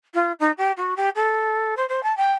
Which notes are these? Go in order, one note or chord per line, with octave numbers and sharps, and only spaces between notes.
F4
D#4
G4
F#4
G4
A4
C5
C5
A5
G5